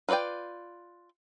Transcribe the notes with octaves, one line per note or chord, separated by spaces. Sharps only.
F4 B4 C#5 D5 G5